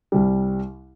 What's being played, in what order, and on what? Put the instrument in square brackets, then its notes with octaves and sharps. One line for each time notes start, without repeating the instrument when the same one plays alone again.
[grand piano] C2 C3 G3